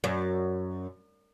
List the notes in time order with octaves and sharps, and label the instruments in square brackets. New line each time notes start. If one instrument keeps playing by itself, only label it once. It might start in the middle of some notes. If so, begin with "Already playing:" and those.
[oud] F#2